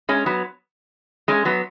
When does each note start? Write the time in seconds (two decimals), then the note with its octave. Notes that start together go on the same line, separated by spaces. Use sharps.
0.09 G#3 C#4
0.26 F#3 B3
1.28 G#3 C#4
1.45 F#3 B3